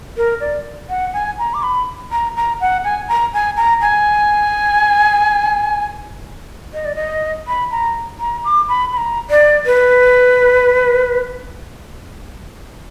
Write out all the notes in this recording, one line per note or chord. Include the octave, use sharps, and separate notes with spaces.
A#4
D5
F#5
G#5
A#5
D6
B5
A#5
A#5
F#5
G#5
A#5
G#5
A#5
G#5
D#5
D5
D#5
B5
A#5
A#5
D6
B5
B5
A#5
D5
B4